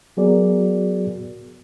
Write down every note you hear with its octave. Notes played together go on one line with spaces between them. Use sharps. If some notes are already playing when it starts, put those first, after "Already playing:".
F#3 B3 F#4 G#4 A#4 D5